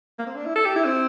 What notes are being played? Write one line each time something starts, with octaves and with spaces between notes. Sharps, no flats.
A#3
C4
D4
E4
A4
G4
E4
C4